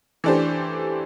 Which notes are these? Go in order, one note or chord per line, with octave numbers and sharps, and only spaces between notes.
E3 A3 D4 G4 C5